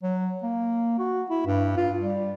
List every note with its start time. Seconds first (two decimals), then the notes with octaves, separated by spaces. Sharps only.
0.03 F#3
0.43 A#3
0.99 F#4
1.30 E4
1.46 G2
1.77 F4
1.98 G3